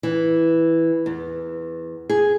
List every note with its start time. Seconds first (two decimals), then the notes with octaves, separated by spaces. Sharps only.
0.03 E3
1.06 E2
2.10 G#4